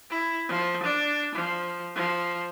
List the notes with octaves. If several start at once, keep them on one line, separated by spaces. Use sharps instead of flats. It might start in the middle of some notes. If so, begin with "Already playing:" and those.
E4
F3
D4
F3
F3